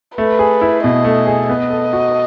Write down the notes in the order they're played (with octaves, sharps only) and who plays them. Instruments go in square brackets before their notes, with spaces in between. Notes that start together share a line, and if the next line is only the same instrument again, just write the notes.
[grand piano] A3 [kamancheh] B4
[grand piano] G#4
E4
[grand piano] B2 [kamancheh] D#5
[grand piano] A3
G#4
[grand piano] B3 [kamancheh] D#5
[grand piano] A4
F#4